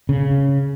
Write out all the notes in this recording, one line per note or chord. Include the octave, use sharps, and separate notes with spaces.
C#3